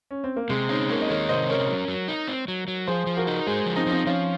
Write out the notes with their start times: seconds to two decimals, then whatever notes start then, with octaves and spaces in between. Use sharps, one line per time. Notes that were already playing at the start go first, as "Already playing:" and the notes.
0.11 C#4
0.24 C4
0.36 A#3
0.49 C3 G#3
0.69 C4 C#4 D#4
0.89 A#3 A#4 C#5
1.02 D#5
1.09 D#3 A#4 C#5
1.29 C3 C5 D#5
1.49 C#4 A#4 C#5
1.69 F#3
1.88 F#3
2.08 D#4
2.27 C4
2.48 F#3
2.68 F#3
2.87 F3 G#4 C5
3.07 F3
3.17 F#4 A#4
3.27 D#4
3.47 G#3 G#4 C5
3.66 F3
3.76 C4 D#4
3.87 F3 C4 D#4
4.06 F3 C#4 F4